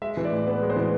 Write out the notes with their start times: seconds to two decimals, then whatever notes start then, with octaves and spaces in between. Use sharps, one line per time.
0.02 G#3 E5
0.17 E3
0.25 D5
0.31 A2
0.47 B3 B4
0.62 G#3
0.70 C5
0.76 E3